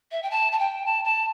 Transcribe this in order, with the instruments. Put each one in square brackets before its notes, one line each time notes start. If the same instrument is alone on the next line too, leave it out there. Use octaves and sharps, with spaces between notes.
[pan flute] E5
G5
A5
A5
G5
A5
A5